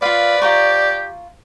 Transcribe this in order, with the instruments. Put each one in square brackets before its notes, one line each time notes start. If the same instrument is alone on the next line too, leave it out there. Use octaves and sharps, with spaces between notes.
[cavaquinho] F4 F5 [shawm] B4 [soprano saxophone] D5
[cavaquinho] F4 A#5 C#6 [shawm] G4